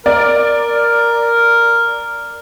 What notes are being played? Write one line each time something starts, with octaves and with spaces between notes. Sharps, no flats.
A#4 D5